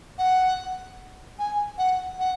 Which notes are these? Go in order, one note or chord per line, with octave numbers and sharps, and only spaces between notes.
F#5
G#5
F#5
F#5